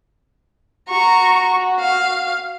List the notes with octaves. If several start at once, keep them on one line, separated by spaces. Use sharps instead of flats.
F#4 A#5 C#6
F5